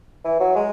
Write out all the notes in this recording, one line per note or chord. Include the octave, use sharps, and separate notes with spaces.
E3
F#3
G#3